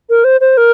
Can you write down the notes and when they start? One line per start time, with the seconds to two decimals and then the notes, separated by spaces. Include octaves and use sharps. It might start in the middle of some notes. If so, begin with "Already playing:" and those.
0.10 A#4
0.24 C5
0.41 C5
0.57 A#4